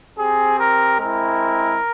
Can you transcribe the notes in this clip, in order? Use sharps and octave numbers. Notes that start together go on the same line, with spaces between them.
C4 G4 G#4
A#4
G#3 C4 E4 A#4